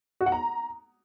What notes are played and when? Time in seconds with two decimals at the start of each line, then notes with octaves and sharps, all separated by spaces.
0.21 F#4
0.26 F#5
0.32 A#5